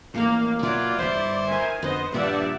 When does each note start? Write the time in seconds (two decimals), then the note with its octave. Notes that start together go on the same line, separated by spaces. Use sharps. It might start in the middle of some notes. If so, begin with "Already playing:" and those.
0.14 A1 D#2 A2 A#3 F5
0.63 B2 F#3 A#3 E4 F4 D5
0.98 D1 G1 E4 C5
1.47 D#3 G#5
1.82 F2 D3 B3 C5 D#5
2.14 G2 A#2 D#3 F3 D5 E5 F#5